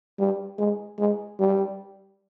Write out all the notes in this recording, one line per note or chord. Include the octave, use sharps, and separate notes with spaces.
G3
G#3
G#3
G3